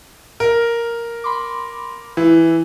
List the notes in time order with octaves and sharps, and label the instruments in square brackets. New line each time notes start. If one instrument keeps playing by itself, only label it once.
[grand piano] A#4
[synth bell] B5 C6 D6
[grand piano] E3 [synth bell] E4